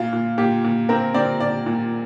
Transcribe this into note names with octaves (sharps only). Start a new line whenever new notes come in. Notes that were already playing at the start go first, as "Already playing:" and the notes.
Already playing: A#2 F4
A#2
A#2 G4
A#2
C4 A#4
C4 D5
A#2 D5
A#2